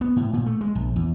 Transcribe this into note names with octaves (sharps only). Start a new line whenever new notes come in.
B3
A2
A#2
A3
G#3
A#1
E2